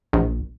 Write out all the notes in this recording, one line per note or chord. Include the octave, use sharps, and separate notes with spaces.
A#1